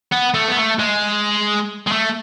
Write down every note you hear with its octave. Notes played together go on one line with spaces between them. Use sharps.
B3
A3
B3
A3
G#3
G#3
A3